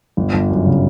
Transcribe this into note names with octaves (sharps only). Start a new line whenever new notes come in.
G1
G1
F#2
C#3